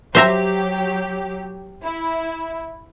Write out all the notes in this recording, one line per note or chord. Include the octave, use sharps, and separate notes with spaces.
F#3 G4 C5 E5 A#5
E4